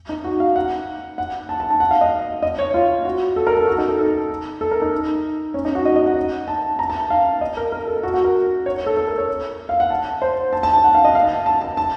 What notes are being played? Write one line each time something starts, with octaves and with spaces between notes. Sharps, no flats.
D#4
F#4
F5
F#5
F#5
A5
A5
A5
F#5
F5
D#5
D#5
C#5
F4
F#4
A4
A#4
A4
F#4
D#4
A4
A4
A4
A#4
D#4
C#4
D#4
F#4
D#5
D#5
F#5
A5
A#5
A5
F5
D#5
A#4
A#4
A4
F#4
F#4
A#4
C#5
A4
A4
A#4
C#5
F5
F#5
A5
C5
A5
A5
A5
F#5
F5
D#5
F5
A5
A5
A5
A5